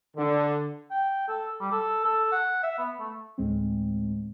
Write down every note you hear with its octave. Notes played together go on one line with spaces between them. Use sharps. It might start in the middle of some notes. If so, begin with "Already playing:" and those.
D3
G5
A4
G3
A4
A4
F#5
E5
B3
A3
D2 A2 G#3 C4